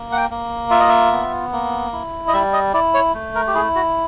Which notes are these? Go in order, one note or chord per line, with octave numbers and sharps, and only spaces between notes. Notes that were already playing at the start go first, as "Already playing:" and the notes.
Already playing: A#3
F#5
G5
A#3
F4 E5
D#5
E5
B3
A#3
E4
D#5
G3 E5
D#5
E4 D5
C#5
A3
A#4
G4
E4 G#4
F#4